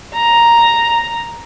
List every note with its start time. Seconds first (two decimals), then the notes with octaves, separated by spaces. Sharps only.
0.15 A#5